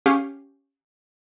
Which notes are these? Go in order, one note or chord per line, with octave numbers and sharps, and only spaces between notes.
C#4 G4 F5